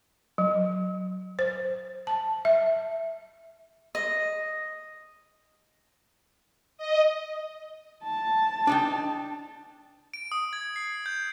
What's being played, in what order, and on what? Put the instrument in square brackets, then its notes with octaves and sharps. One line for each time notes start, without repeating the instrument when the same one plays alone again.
[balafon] F#3
C5
A5
E5
[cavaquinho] D#5
[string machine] D#5
[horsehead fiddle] A5
[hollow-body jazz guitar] D4 D#4 G5
[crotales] D7
D#6
G#6
C7
G6